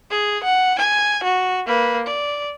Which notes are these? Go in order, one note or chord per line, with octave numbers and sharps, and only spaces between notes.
G#4
F#5
G#5
F#4
A#3 B4
D5